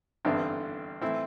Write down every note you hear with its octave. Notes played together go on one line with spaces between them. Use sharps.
A1 G2 D3 G3 B3 C4 E4
A2 E3 A3 C4 E4